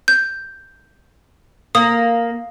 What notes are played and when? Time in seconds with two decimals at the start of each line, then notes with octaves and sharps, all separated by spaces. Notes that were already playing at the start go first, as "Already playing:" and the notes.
0.08 G6
1.75 A#3 D#6